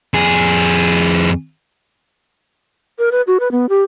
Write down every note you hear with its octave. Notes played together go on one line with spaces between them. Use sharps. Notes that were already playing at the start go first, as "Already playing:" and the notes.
F2 G#4
A#4
B4
F#4
B4
B3
G4